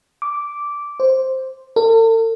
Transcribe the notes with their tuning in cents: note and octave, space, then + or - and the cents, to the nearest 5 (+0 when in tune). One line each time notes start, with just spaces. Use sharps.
D6 -10
C5 +5
A4 +45